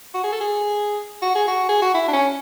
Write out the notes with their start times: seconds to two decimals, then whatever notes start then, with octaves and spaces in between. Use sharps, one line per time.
0.14 F#4
0.24 G#4
0.32 A4
0.40 G#4
1.22 F#4
1.35 G#4
1.48 F#4
1.69 G#4
1.82 F#4
1.94 E4
2.08 D4
2.13 C#4